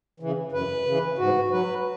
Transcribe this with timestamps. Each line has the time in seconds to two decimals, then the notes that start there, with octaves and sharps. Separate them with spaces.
0.20 C#3 E3
0.52 F#2 B4
0.85 C#3 E3
1.18 G#2 F#4
1.51 F#3 B4